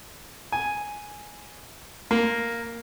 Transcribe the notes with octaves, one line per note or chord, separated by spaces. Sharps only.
G#5
A#3